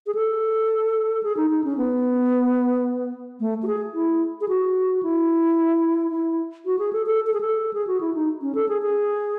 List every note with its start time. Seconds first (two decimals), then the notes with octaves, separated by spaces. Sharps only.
0.06 G#4
0.15 A4
1.23 G#4
1.37 D#4
1.50 D#4
1.64 C#4
1.77 B3
3.40 A3
3.63 F#4
3.67 G#4
3.94 E4
4.41 G#4
4.49 F#4
5.03 E4
6.11 E4
6.66 F#4
6.79 G#4
6.93 A4
7.06 A4
7.27 A4
7.34 G#4
7.41 A4
7.73 G#4
7.87 F#4
8.01 E4
8.14 D#4
8.42 C#4
8.55 A4
8.69 G#4
8.82 G#4